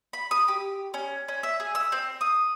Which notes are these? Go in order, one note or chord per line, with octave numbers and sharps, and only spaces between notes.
B5
D#6
G4
C#4
C#4
E5
G#4
E6
C4
D#6